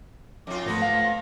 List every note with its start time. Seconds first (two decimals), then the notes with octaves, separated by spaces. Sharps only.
0.47 F2 F4 D6
0.66 G#2 F3 A3 B3 B4 A#6
0.82 F5